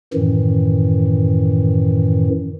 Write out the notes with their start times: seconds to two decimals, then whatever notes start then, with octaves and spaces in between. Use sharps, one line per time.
0.14 F#2 A2 D#3 E3